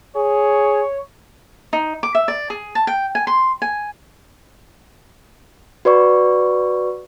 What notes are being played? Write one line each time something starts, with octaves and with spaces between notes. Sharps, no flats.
G#4 C#5
D#4
D6
E5
D5
G#4
A5
G5
G#5
C6
G#5
F#4 B4 D5 C#6